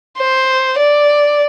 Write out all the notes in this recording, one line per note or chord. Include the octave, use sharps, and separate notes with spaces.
C5
D5